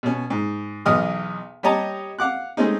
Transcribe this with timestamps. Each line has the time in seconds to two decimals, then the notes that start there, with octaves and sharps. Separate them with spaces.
0.03 B2 C#4
0.30 G#2
0.86 B1 E2 B3 D#5 D#6 F6
1.63 G3 G4 C#5 D#5 A5 A#5
2.19 F5 F#5 D6 F#6
2.57 G#3 A3 C4 C#4 D#4